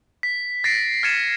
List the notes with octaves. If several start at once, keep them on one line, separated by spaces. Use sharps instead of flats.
B6
A6 A#6 C7 D7
F6 G#6 A6 C#7 D#7 E7